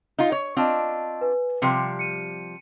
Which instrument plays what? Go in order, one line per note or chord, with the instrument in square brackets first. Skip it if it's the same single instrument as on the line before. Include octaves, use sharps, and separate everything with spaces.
[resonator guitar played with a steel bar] D#4 F4
C#5
[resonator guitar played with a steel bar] C4 D4 F4 [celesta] D#5 A5 E6
[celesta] B4 G#5
[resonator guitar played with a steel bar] C3 F3 G3 [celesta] G5 C6 C#7
[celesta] C#7 D#7